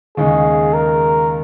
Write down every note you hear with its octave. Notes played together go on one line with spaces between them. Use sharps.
D#2 C#3 G#3 D#4 G#4
A#4